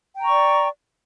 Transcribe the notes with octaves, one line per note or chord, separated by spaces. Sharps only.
D5 G5 A#5 C#6